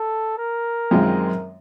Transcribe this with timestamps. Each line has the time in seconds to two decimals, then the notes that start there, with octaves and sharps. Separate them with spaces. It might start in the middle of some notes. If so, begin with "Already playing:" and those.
Already playing: A4
0.38 A#4
0.91 F#2 D#3 G#3 C4 F4